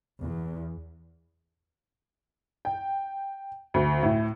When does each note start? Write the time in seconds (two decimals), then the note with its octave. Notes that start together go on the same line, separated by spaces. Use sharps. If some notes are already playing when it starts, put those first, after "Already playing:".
0.22 E2
2.65 G5
3.74 D2
4.03 A2